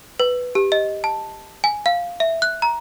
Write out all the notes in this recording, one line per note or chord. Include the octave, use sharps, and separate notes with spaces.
B4
G4
D#5
A5
G#5
F5
E5
F#6
A#5